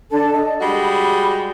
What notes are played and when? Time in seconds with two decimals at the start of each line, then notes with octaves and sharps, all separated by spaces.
0.11 D4 A4 A5
0.33 D#5
0.61 G3 G#3 F#4 B5